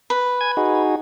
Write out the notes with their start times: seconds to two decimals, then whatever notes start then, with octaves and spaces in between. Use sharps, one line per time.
0.10 B4
0.41 G#5 G#6
0.57 D#4 F#4 G#4